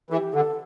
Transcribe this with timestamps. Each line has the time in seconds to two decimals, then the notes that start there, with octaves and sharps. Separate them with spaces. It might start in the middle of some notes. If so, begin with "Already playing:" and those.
0.10 E3 A4
0.15 G4
0.34 D3 A4